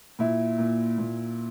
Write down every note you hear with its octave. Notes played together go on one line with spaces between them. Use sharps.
A#2 E4
A#2
A#2